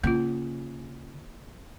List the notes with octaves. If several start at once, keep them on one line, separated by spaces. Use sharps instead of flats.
C#3 A#3 F4